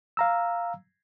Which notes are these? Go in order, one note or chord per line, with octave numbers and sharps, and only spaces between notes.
F5 A#5 E6